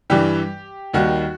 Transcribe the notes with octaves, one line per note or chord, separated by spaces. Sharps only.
G2 E3 G3 G4
D#2 D#3 G3 F#4